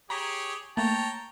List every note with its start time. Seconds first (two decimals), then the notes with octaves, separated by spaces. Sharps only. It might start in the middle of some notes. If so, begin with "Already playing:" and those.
0.10 G4 G#4 C#5 A#5 B6
0.77 A3 A#3 C#5 G5 A5 A#5